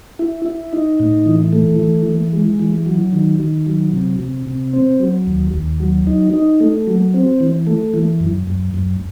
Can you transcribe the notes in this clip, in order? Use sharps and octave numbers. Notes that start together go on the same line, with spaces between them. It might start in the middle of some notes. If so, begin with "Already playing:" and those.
E4
E4
D#4
A2
E3
A3
E3
E3
G#3
E3
F#3
D#3
D#3
F#3
C3
C3
C3
C4
F#3
D#2
D#2
F#3
D#4
D#4
A3
F#3
C4
E3
A3
E3
F#2
F#2
F#2